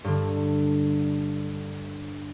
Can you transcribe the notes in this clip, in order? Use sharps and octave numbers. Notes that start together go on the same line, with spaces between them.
G2 D3